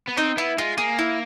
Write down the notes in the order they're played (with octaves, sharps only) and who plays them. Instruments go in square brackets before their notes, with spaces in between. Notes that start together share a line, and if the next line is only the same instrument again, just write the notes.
[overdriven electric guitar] B3
[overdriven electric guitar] C4 [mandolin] D#4
[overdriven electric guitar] B3 [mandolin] E4
[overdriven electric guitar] G#3 [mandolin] F4
[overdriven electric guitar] A#3 [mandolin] G#4
[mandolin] E4